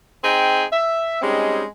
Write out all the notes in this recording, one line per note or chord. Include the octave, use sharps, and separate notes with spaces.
C4 D#4 G#4 G5
E5
G3 G#3 C4 C#4 D#4